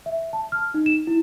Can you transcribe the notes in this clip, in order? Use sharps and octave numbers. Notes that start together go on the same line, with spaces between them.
E5
A5
F6
D#4
E7
E4